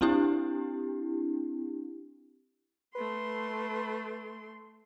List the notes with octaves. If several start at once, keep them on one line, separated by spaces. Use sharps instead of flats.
C4 D4 E4 G4
A3 B4 C6